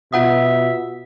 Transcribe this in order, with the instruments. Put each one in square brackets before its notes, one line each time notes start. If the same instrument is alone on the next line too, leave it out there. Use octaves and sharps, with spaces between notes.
[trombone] B2 [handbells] F4 F#5 D#6 [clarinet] E5